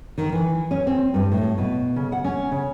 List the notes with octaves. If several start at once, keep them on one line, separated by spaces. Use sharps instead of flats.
D#3
E3
C#4
C4
G2
A2
B2
C#3
F#5
C#4
C#3